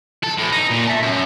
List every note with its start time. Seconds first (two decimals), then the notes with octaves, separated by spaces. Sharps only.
0.23 A4
0.38 A2 E3
0.52 D#4
0.71 A#2
0.87 E5 A5
1.02 F#2